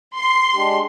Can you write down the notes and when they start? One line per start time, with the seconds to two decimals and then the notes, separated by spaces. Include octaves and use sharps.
0.15 C6
0.54 G#3 D4 G4